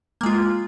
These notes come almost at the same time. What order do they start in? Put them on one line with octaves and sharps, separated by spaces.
A#3 G#3 F4